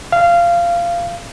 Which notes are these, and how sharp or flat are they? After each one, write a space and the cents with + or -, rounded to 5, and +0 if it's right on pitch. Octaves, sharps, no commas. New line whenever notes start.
F5 -20